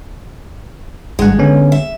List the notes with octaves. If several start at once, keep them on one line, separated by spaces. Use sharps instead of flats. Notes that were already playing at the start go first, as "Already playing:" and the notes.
G#1 G2 G#3 F#5
D3 B3 C#4
E5